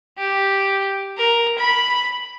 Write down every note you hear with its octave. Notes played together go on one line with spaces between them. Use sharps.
G4
A#4
B5